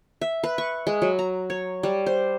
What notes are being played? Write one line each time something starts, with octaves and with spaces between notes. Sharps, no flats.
E5
B4
C#6
G#3
F#3
A#5
C#5
G3
C5